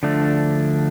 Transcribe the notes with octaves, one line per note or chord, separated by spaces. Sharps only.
D3 F3 A3 D4